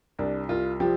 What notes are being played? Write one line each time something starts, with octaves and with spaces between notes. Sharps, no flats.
C2 D4
C2 F4
F3 G4